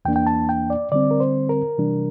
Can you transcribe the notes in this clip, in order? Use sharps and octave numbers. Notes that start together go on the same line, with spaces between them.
E2 E3 A#3 D4 G5
G5
A5
G5
D5
D3 G3 C4 D5
A#4
C5
A#4
C3 E3 G3 D4